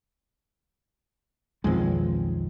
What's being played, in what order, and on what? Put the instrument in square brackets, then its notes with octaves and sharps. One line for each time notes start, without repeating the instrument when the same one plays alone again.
[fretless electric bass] B1 F2 G#3 [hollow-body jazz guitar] D#3 F3 C4